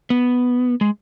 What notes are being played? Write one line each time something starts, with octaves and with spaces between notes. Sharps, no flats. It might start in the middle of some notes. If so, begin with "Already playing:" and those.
B3
G#3